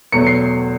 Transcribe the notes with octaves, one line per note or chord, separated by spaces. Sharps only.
E2 B2 F#3 A3 C#7
C7